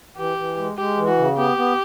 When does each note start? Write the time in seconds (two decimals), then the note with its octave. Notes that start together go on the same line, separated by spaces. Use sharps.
0.18 E3 G4
0.37 E3
0.57 G#3
0.77 G#3 G4
0.97 E3
1.08 F#4
1.18 C#3
1.37 B3 G4
1.57 B3